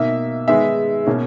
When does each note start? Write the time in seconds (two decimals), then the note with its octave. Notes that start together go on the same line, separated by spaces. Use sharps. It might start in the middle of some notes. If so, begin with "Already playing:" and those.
Already playing: B2 A#3 D#4 E5
0.48 D#3 G#3 B3 D#4 E5
1.06 B2 A#3 C#4